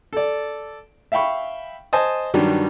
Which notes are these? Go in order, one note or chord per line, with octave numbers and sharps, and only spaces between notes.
A4 D5
E5 F5 G5 B5 C#6
C5 D#5 G#5 A5 D#6
G2 D#3 F#3 G3